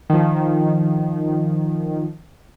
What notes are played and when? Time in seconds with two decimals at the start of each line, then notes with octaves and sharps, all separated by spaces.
0.10 D#3 F3